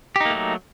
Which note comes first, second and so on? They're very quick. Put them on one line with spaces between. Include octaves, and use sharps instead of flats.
G4 D#4 A#3 A3 F#3